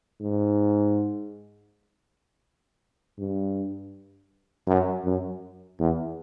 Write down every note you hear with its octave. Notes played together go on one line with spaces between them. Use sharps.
G#2
G2
F#2
F#2
E2